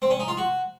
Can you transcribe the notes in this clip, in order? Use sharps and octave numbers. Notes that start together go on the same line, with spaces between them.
C4
C#4
D#4
F4
F#4